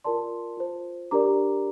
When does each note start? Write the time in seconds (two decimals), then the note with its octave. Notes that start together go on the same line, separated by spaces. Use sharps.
0.04 F4 A#4 D5 A5 C6
0.57 F4 C5
1.11 D4 G4 A#4 D5 A#5 D6